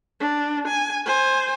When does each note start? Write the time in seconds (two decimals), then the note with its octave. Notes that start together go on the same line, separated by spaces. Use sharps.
0.20 D4
0.68 G#5
1.06 C5 G#5